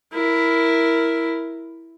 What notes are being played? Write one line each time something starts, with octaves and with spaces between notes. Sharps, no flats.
E4 A#4